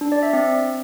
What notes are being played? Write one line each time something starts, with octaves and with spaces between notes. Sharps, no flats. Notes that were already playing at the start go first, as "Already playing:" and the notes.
D4
D5
E5
C4